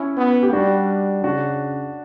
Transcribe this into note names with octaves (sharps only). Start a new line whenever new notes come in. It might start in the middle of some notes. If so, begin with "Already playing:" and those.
Already playing: C#4 E4
B3
G4
G3 D4 F#4
C#3 D4 F#4